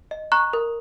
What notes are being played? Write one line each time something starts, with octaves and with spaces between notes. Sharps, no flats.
D#5
A#5 C#6 F#6
A#4